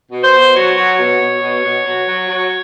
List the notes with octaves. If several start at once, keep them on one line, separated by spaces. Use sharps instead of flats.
B2
C5
B2
F#3 C#5
F#3
B2
B2
B2
B2
F#3
F#3
F#3